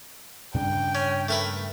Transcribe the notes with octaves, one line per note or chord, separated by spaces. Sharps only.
G2 C#3 D4 G5
C#4
A3 A#4 B4